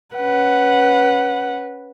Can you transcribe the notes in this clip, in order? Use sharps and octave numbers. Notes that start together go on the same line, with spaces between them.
C#4 B4 F#5